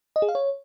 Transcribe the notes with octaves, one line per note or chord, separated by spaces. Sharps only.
D#5
G#4
F5
C#5